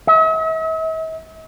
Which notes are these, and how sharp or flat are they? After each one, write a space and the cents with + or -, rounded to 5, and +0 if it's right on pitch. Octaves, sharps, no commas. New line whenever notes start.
E5 -45